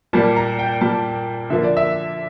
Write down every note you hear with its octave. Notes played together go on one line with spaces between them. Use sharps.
A#2 G3 A#3 A5
A#5
G5
A#2 G3 A#3 A5
D3 F3 A#3 E5
D5
E5